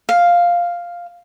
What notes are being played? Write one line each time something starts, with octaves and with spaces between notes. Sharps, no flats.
F5